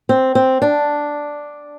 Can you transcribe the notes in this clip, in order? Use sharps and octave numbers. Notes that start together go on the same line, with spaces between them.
C4
C4
D4